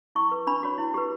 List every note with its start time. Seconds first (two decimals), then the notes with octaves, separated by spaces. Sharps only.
0.15 E4 C#6
0.31 B4
0.47 D4 B5
0.63 F#4 C#5
0.78 E4
0.94 G4 B4